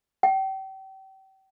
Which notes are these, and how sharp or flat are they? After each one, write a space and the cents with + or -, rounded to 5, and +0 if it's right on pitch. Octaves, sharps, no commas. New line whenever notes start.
G5 -35